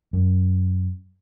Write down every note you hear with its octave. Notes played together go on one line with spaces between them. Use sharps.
F#2